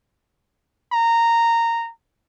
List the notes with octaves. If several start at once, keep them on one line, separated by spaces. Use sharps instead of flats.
A#5